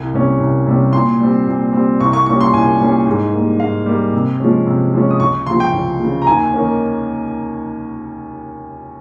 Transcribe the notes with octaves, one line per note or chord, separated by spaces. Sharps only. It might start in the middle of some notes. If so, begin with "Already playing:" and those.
Already playing: C2
C3 G3 C#4
C2
C3 G3 C#4
A#2 C6
G3 C4
A#2
G3 C4
C2 C#6
C#6
A#2 G3 C#4 C#6
C6
C2 G#5
A#2 G3 C#4
G#2
G3 A#3
G#2 F5
G3 A#3
C3
F3 G#3 C#4
C3
F3 G#3 C#4
D#6
C#2 C#6
C#3 F3 C6
G5
C#2
C#3 F3
A#5
D#2 G#5
D#3 A#3 C#4